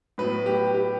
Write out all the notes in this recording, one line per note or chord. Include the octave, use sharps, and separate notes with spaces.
A2 F#3 B3 B4
G4
G4